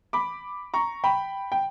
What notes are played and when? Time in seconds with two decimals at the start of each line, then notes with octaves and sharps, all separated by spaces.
0.13 B5 D6
0.74 A#5 C#6
1.04 G5 B5
1.52 G5